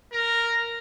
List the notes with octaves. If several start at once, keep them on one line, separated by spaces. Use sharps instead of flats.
A#4